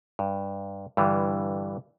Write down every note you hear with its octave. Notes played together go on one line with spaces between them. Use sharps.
G2
G2 D3 E3 G3